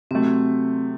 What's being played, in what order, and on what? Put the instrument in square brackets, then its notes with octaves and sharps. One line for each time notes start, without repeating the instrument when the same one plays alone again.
[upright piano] C3 F#3 A3 [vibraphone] C4